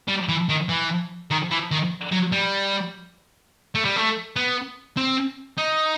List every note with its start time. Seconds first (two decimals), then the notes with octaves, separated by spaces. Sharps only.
0.08 G3
0.29 E3
0.49 D#3
0.69 E3
1.31 D#3
1.51 E3
1.71 D#3
2.12 F#3
2.32 G3
3.75 A3
3.85 G3
3.96 A3
4.36 B3
4.97 C4
5.58 D#4